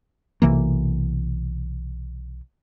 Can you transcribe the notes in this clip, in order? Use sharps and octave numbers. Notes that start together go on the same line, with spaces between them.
B1 C3 E3 A#3